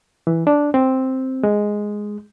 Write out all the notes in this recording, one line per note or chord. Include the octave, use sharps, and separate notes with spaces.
E3
D4
C4
G#3